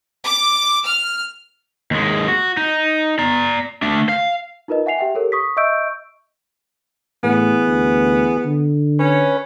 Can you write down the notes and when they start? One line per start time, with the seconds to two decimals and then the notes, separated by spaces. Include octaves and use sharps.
0.24 D6
0.86 F6
1.91 D#2 G#3
2.28 F#4
2.57 D#4
3.19 D5 A#5
3.82 A3 D4
4.09 F5
4.68 D#4 F4 A#4 B4 D#5
4.86 E5 F#5 G#5 C7 F7
4.98 G4 E5 F#5 G5
5.15 G4 A4 A#4 C#5
5.32 C#6 D#6 B6
5.57 D#5 E5 C#6 E6 G6 D7
7.23 A2 E3 B3 G#4
7.68 D2
8.46 D3
8.99 C#4 B4 C#5